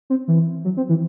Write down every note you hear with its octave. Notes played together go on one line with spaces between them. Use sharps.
C4
E3
F#3
C4
E3